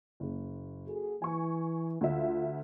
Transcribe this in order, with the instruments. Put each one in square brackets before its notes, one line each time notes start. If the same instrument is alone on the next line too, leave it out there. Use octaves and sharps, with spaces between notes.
[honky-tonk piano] F#1
[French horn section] F#4 G#4 A4
[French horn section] E3 [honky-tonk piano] G#5 C#6
[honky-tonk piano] D2 E5 [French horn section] F4